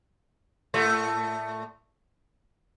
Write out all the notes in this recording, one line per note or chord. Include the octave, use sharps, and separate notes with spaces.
A2 A3